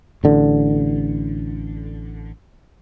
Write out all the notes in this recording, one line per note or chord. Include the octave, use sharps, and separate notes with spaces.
A1 D3